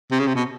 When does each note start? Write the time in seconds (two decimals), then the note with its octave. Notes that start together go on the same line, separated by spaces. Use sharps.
0.11 C3
0.19 C#3
0.27 C3
0.35 B2